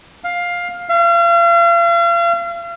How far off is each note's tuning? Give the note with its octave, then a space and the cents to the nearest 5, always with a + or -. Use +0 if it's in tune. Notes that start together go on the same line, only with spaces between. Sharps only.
F5 +10
F5 -40